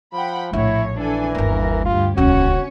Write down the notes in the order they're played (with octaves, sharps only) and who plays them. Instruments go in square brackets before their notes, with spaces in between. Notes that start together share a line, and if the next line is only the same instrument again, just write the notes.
[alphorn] F3 [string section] F#5 G5 B5
[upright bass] A#1 [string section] A2 C#5 [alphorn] E4
[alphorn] E3 [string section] D4 A4 G#5
[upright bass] G1 D#2 [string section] A#4
[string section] D2 G2 G4 [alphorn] F4
[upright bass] D#1 C#2 [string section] C#4 C#5 [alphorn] F#4